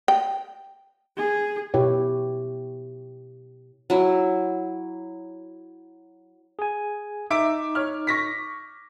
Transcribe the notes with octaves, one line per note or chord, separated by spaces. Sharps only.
G5
G#4
B2 E4 G4 C#5
F#3 E4
G#4 G#5
D#4 E5 D6 D7
C#5 F6
C#6 A#6 B6